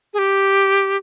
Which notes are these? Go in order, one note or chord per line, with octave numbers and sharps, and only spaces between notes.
G#4
G4